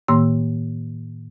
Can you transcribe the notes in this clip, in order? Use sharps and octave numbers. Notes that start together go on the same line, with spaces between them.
A2 D#3 A#3 C6 E6